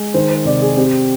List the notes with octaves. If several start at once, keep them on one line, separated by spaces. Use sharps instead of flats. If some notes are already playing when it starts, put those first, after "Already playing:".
Already playing: G#3
D#3 C5
C5
C3 D5
G#4
C4 G4